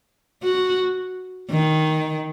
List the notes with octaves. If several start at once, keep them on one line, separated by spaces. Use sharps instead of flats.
F#4
D#3